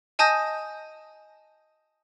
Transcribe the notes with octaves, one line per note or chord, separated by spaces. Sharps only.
D#5 G#5 A5 D#6 G6 A#6